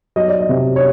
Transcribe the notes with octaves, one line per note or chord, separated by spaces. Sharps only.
F#3 D#5
D5
D#5
C3
C#5